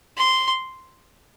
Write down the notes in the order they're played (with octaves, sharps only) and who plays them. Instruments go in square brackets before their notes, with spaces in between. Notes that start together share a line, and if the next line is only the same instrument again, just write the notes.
[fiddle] C6